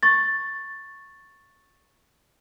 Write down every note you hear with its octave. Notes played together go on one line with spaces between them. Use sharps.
C#6 A6